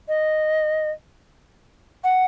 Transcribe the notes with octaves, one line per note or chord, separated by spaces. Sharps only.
D#5
F#5